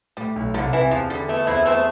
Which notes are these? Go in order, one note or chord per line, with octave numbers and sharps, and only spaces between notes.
A2 G3
B1
C2 D3
C3 E3
E2 F3
D3 G3
A3 B3
E2 C4 E4
A3 B3 C4